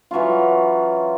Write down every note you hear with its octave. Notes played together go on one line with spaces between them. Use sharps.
E3 F#3 C#4 F4